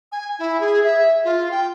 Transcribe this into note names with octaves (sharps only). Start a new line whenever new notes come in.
G#5
E4
G#4
E5
F4
G5